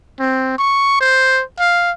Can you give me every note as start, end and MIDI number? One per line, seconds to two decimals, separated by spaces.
0.19 0.54 60
0.58 0.98 85
1.00 1.42 72
1.59 1.91 77